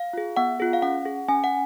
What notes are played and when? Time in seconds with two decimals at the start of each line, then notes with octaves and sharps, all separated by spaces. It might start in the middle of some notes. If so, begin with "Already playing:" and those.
Already playing: F5
0.13 F4 G#4
0.37 B3 F#5
0.60 F4 G#4
0.73 F5
0.82 C#4 F#5
1.05 G#4
1.28 C#4 G#5
1.44 F#5